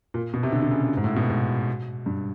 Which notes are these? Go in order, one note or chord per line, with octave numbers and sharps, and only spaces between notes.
A#2
B2
C3
D3
D3
C#3
G#2
A2
B2
G#2
G2